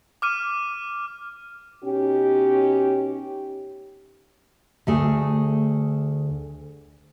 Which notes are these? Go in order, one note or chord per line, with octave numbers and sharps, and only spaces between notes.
D6 F6 D#7
B2 C#4 D#4 G4
D2 A3 G#4